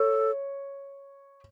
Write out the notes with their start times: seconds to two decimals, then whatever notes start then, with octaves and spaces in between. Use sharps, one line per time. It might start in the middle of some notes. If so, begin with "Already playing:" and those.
Already playing: A4 C#5